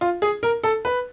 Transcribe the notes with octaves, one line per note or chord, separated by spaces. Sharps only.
F4
G#4
A#4
A4
B4